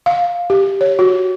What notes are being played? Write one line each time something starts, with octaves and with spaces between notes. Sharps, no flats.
F5
G4
C#5
F#4